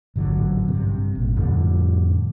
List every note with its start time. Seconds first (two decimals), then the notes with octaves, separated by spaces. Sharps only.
0.16 A1 G#2 D3 F#3
0.66 G2 C3
1.15 G#1 A#2
1.36 F2 A2 D3 G3